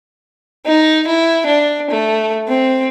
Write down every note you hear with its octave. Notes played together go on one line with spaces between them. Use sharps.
D#4
E4
D4
A3
C4